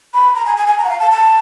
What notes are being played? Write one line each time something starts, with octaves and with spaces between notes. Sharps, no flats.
B5
A#5
G#5
G#5
G#5
A#5
F#5
F5
A5
A5